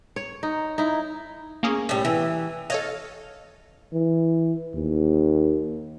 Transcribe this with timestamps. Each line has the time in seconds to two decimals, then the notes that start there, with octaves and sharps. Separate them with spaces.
0.16 C#5
0.43 D#4
0.78 D#4 E4
1.63 A#3 C#4 G#4
1.89 A2 G3
2.05 E3
2.70 A4 C#5 D#5 F5
3.93 E3
4.75 D#2